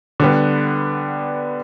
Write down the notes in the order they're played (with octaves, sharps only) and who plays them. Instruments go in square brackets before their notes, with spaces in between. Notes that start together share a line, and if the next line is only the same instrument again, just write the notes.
[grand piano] D3 G3 B3